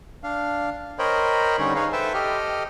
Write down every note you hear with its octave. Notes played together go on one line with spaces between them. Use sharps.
D4 F5
A#4 C5 C#5 D#5 G5 B5
D3 G3 C#4 D#4 C#5
D#4 G#4 B4 C#5 F5
A4 B4 C5 E5 G5 A5
G4 A4 D#5 G5 F6